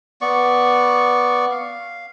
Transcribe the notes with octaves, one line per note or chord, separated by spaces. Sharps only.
B3 D5 C#6
F5